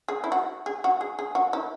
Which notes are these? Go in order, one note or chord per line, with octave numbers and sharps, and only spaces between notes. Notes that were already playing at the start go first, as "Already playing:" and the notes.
G#4
E4
F#4
G#4
F#4
G#4
G#4
F#4
E4